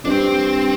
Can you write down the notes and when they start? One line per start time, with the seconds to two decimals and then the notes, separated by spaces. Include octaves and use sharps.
0.05 F2 D4
0.09 G2 C4